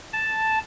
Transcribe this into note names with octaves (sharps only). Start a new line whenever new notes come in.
A5